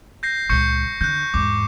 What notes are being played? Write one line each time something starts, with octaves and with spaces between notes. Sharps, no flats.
G6 A#6 C7
C#2 A#2 C#6 G6 C#7
D3 F#6 G6
E2 G#2 D6